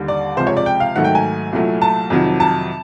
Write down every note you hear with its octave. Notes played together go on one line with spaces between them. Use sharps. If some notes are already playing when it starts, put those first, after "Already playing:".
Already playing: D#2 D3 G3
D5
C#2 C3 F3 G#3 C5
C#5
D5
G5
F5
G#2 D#3 F#3 A3 F#5
G5
G#5
C2 A#2 F#3 A3
A5
F2 C3 D#3 F#3
A5